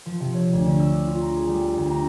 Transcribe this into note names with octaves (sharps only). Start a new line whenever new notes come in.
F3
C3
C#5
D2
D3
E6
F4
A#5
G#4
G3
D2
A#5